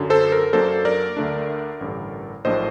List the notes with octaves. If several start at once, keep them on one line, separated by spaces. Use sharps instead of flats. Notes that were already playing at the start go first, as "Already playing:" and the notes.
Already playing: F#2 D3 F#3
A4 C5
A#4
F#2 F#3 A#3 D4 A4 C5
A#4 D5
D2 D3 A3 D4
A1 G2 D3
A#1 A2 F#3 A#3 D4 C5 D#5